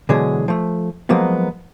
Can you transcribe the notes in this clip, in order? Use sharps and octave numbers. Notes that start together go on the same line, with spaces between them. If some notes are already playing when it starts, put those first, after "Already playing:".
B2 D3 E3 F#3 G#3 G#4
F3 A3
F3 F#3 G#3 A#3 B3